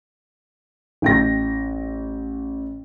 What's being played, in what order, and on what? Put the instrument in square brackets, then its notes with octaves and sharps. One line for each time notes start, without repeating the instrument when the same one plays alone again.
[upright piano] A1 G5 A#6